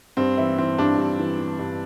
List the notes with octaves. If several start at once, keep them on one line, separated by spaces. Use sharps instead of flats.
G2 C4
E3 E4
E3 C4
G2 D4
G2
E3
E3
G2